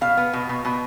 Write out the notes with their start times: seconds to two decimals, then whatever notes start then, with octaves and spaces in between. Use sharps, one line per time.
0.01 B2 F5
0.17 B3
0.33 B2
0.49 B2
0.65 B2